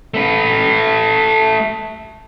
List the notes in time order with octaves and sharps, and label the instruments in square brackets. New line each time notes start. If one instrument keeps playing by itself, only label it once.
[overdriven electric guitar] A3 B4